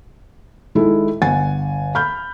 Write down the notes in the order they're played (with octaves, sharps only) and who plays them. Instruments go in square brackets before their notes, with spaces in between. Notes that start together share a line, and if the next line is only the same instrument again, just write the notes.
[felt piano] D#3 G#3 E4 A4
G1 F#5 G#5 A6
B5 F6 G6